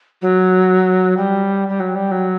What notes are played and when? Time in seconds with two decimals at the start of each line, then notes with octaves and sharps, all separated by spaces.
0.22 F#3
1.17 G3
1.68 G3
1.80 F#3
1.95 G3
2.11 F#3